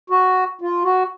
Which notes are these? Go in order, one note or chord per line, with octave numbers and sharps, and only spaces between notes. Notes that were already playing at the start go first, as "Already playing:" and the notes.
F#4
F4
F#4